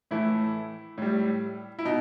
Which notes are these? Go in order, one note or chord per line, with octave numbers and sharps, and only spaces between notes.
A2 E3 A3 E4
A2 G3
E4
B2 D#4